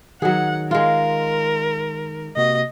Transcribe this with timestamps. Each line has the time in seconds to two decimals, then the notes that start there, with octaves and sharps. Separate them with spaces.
0.22 D#3 F#3 D#4 G#4 F#5
0.71 G#3 F4 A#4
2.37 C3 A#3 F#4 D#5